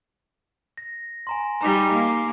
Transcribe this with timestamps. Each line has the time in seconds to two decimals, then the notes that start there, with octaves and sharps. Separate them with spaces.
0.77 A#6
1.27 G#5 A#5 C6
1.61 G3 D#4 A#5 D6 B6
1.92 A#3